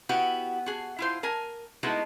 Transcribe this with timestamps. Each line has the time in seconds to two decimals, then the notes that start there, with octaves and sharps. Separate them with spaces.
0.09 B3 E4 F#4 G4
0.66 F#4 G#4
0.99 E4 F4 C5
1.23 A#4 G#5
1.83 G#3 A3 B3 D#4 E4 F#4